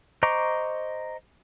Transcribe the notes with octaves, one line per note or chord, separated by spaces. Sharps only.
C5 D#5 A#5 C#6 D6